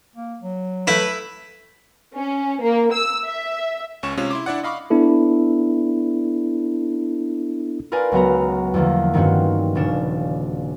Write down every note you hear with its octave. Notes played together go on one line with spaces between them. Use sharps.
A#3
F#3
A3 E4 B4
C#4
A#3
E6
E5
C#2 C#4 C#6 E7
C3 G#3 C#4 F4
E4 C6 D6
D4 E4 D5 F#5
D#5 F5 B5 C#6 D6
B3 D4 E4 A4
F4 A#4 B4 D5 G#5
C#2 F#3 B3 F#4 A#5
E2 D3 F3 A3 A#3
G2 D#3 F3 C4 C#4 F#4
D#1 C#3 C#4 D4 E7